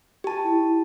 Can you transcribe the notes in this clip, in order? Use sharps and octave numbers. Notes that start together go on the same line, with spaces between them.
G4 A5
E4
E4